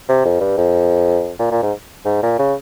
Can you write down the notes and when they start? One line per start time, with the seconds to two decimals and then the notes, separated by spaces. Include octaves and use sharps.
0.09 C3
0.25 F2
0.41 G2
0.58 F2
1.39 A#2
1.51 A#2
1.62 G#2
2.05 G#2
2.23 A#2
2.39 C#3